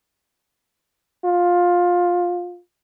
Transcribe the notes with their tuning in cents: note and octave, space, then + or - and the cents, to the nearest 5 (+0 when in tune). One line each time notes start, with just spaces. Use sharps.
F4 +15